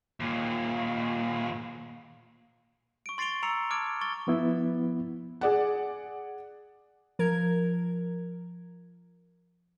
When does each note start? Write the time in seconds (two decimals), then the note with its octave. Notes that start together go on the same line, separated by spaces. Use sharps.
0.20 D#2 A#2
3.06 C#6 D7
3.18 C6 A6 C7 D7 F7 G7
3.43 A#5 E6 C7 C#7 F7
3.70 A5 D6 F6 G#6 D7
4.01 C#6 A6 G7
4.27 F3 B3 E4
5.41 G#4 D5 F#5
7.19 F3 A#4 G#6